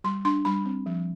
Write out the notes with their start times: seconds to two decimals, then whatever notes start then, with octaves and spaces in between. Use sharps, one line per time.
0.04 G3 C6
0.25 D4 C6
0.45 G3 B5
0.65 C4
0.86 F3